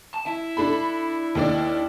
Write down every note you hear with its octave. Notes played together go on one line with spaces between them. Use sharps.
A5
E4
D4 A4 B5
D#2 D4 D5